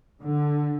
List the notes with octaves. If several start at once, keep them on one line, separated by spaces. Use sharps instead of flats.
D3